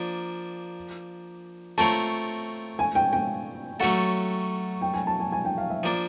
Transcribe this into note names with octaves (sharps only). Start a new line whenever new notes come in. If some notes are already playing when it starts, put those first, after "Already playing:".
Already playing: F3 A#3 D4
A3 C4 F4 A#4 C#5 A5
G#5
G5
G5
F#3 A3 C#4 F#4 A4 F#5
G5
G#5
A5
G#5
G#5
G5
F5
E5
F3 A#3 D4